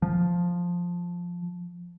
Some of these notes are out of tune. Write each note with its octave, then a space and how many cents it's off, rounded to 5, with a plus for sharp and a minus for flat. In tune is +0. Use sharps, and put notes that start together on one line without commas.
F3 +5